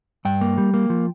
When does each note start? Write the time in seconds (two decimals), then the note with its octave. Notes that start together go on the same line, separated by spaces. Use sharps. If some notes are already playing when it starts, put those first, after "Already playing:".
0.25 G2 G5
0.41 A#3
0.58 G3
0.74 A#3
0.90 F3